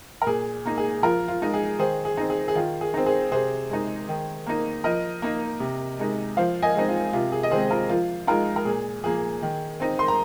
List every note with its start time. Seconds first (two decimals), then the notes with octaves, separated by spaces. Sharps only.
0.22 A#4
0.27 A#2 G#4
0.65 A#3 D#4
0.78 G#4
1.03 F3 F4 A#4
1.28 F4
1.42 G#3 D#4
1.54 G#4
1.79 D#3 G#4 C5
2.05 G#4
2.17 C4 D#4
2.30 G#4
2.48 G#4
2.55 D#3 F4
2.81 G#4
2.94 C4 D#4
3.06 G#4 C5
3.31 C3 G#4 C5
3.70 G#3 D#4
4.09 D#3
4.47 A#3 D#4
4.84 F3 A#4 D#5
5.22 A#3 D#4
5.60 C3
5.99 G#3 D#4
6.37 F3 C5 F5
6.63 D#5 G#5
6.75 G#3 C4 D#4
6.88 F4
7.13 C3 F4
7.32 G#4
7.43 D#5
7.51 D#3 G#3 C4 G#4 C5
7.70 F4 A#4
7.89 F3 F4
8.27 G#3 D#4 F4 A#4
8.56 A#4
8.65 A#2 G#4
9.04 F3 A#3 G#4
9.42 D#3
9.80 C4 D#4
9.99 C6
10.08 A#5